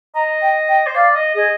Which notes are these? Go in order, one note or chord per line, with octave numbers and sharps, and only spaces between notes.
D#5 A#5
G5
G5
C5
D5 F5
D#5
G#4 D#5